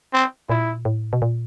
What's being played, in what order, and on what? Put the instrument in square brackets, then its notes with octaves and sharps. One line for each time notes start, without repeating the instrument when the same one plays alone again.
[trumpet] C4
[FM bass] A#2 [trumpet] E4
[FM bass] A2
B2
A#2